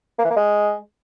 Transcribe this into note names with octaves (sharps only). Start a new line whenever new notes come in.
A#3
E3
A#3
G#3